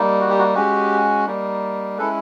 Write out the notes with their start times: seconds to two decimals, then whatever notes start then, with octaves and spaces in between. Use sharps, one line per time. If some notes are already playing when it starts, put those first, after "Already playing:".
Already playing: G3 A#3 D#4
0.20 F#4
0.29 G4
0.39 F#4
0.54 G#3 C#4 F#4 G4
1.27 G3 A#3 D#4
1.98 G#3 C#4 E4 A4 B4